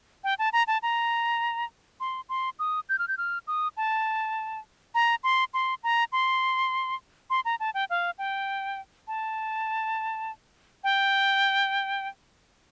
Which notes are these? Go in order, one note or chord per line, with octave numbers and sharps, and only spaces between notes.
G5
A5
A#5
A5
A#5
C6
C6
D#6
G6
F6
G6
F6
D#6
A5
A#5
C6
C6
A#5
C6
C6
A#5
A5
G5
F5
G5
A5
G5